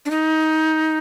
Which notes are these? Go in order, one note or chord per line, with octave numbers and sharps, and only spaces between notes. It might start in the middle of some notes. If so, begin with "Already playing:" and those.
D4
D#4